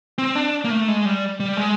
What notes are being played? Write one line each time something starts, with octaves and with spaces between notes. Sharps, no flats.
C4
D4
A#3
A3
G#3
G3
G3
G#3